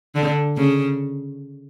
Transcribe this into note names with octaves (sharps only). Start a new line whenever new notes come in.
D3
C#3